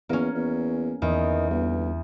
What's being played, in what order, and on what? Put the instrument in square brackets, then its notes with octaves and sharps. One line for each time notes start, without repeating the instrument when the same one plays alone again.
[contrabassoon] E2 [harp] A#3 C#4
[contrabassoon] E2
[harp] E2 [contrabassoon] D#3
[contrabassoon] G1